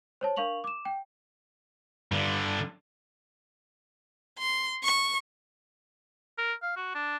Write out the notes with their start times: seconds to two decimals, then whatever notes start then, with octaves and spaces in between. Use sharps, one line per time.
0.21 C5 C#5 A5
0.36 D4 A#4 F5 C#6 F7 F#7
0.64 D6 E7
0.85 G5
2.12 G2 D3
4.39 C6
4.83 C#6
6.38 A#4
6.63 F5
6.77 F#4
6.95 D4